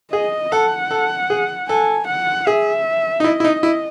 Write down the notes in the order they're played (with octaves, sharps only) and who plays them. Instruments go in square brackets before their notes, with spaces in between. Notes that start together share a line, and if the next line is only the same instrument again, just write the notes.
[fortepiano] G#4 [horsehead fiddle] D#5
[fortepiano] A4 [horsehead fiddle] F#5
[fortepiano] A4
G#4
[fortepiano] A4 [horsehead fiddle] G#5
[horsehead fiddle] F#5
[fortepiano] G#4 [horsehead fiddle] E5
[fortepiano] D#4
[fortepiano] E4 [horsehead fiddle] D#5
[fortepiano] E4
D#4
E4